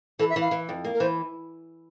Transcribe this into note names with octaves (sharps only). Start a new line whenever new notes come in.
E3 A4
E5
E3
F5
E3
F2
A#3
A#4
E3 C5